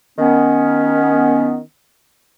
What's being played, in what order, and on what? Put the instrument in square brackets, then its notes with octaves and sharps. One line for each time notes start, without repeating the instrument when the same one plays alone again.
[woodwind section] D#3 B3 C#4